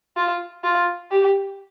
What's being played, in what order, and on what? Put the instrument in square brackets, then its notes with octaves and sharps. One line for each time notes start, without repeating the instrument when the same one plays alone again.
[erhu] F4
F4
G4